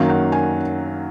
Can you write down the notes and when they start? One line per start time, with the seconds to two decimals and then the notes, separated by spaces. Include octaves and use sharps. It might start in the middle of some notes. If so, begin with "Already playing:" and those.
Already playing: F#2 D#3 F#3 A#3 F5
0.09 F#5
0.32 G#5